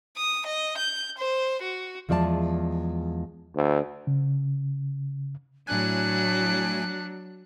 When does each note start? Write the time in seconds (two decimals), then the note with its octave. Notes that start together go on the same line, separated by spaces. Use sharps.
0.17 D#6
0.46 D#5
0.78 G6
1.18 C5
1.62 F#4
2.09 E2 F3 G#3 D5 E5 A5
3.55 D2
4.07 C#3
5.67 A2 F#3 D4 G#5 F#6